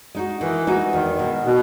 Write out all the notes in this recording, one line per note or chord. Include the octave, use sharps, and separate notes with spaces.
G#3 D#4 F#4
D#3 E3
G#3 D#4 F#4
E2 D#3
B2 G#3
B2